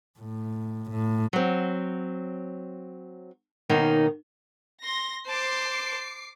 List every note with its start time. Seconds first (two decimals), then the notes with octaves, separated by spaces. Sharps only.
0.20 A2
0.91 A2
1.33 F#3 C4
3.69 B2 D#3 A#3 C#4 D#4
4.83 C6 A#6
5.26 C5 A5 D6 C7